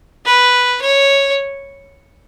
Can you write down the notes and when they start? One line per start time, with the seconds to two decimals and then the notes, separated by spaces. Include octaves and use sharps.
0.25 B4
0.81 C#5